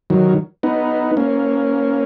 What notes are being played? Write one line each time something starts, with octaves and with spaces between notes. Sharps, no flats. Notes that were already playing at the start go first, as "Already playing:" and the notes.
D#3 F#3
B3 D#4
A#3 C#4